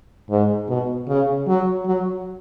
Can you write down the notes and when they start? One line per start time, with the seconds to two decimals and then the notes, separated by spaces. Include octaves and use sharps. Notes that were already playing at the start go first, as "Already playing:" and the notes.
0.30 G#2
0.69 B2
1.08 C#3
1.48 F#3
1.86 F#3